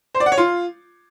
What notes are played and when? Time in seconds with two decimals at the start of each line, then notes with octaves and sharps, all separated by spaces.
0.15 C5
0.20 D5
0.26 F#5
0.32 C#5
0.38 F4